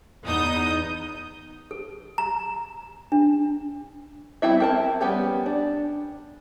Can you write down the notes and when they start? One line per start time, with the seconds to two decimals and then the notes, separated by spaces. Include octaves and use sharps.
0.23 E2 B3 D#4 D#6 G6
1.71 A4
2.18 A#5
3.12 D4
4.42 G3 C4 E4 E5
4.60 C4 A#4 A5
5.01 G3 B3 C#4 G4
5.46 D4